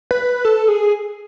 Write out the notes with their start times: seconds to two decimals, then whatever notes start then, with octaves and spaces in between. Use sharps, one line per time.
0.11 B4
0.45 A4
0.68 G#4